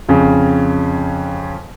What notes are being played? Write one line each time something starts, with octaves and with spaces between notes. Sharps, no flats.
F2 C#3